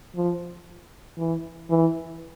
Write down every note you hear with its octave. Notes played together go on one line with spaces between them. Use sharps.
F3
E3
E3